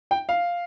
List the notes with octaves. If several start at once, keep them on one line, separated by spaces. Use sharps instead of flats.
G5
F5